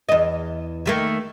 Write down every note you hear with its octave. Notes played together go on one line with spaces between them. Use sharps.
E2 D#5
D#3 A3 A#3